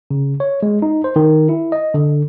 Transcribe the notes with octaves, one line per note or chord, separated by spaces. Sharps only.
C#3
C#5
G#3
D#4
C5
D#3
E4
D#5
D3